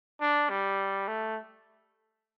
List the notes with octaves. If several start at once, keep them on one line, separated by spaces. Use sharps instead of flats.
D4
G3
A3